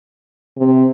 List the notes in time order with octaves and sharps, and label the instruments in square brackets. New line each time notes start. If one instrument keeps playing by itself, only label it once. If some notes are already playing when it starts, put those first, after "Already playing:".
[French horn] C3